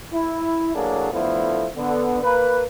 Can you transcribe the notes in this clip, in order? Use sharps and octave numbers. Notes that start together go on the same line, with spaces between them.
E4
A2 F#3 A#3 D4 G#4
D3 F3 A3 B3 E4
D3 B3
A#3 B4